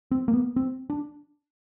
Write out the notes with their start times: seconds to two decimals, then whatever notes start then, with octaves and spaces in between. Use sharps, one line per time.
0.11 C4
0.28 A#3
0.34 B3
0.56 C4
0.90 D4